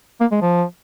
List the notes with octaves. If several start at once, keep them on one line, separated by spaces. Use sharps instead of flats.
A#3
G#3
F3